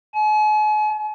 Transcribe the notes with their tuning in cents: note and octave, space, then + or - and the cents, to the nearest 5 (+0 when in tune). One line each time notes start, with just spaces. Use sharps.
G#5 +45